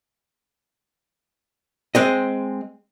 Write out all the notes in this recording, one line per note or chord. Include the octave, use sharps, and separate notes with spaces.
G#3 C4 D#5